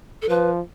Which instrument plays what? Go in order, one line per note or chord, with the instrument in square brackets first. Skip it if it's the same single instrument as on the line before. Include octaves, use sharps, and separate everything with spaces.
[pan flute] A4
[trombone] F3 [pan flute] B4